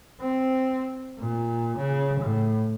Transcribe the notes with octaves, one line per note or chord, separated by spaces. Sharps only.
C4
A#2
C#3
A2